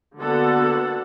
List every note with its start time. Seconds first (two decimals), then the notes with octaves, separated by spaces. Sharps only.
0.19 D3 A#3 B3 F#4 A4 F#5